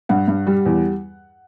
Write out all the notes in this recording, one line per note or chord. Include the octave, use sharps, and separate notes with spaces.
G2 F#5
G2
G3
E2